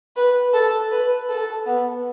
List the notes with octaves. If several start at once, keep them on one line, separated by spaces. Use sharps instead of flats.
B4
A4
B4
A4
B3